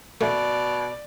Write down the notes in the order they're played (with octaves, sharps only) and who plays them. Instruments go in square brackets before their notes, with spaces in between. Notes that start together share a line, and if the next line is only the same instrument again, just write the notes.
[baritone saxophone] B2 [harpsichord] A3 [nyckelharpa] D5